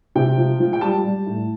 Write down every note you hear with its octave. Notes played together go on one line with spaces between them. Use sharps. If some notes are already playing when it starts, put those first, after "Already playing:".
C3 G5
F3
F3
G5
G3 A5
G3
A2